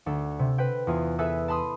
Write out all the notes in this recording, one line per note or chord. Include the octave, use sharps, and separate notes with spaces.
D2 A4
C3
B4 C5 G5
E2 F4 G#4
G#4 A4 B4 E5
A5 B5 C6 D#6